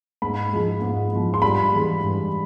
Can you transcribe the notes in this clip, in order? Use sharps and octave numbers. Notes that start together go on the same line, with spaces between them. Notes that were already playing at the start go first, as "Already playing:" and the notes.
G#2 B5
F3 G#3
G#2
F3 G#3
C6
G2 B5
E3 G#3
G2